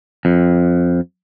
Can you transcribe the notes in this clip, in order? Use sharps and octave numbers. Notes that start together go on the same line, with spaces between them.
F2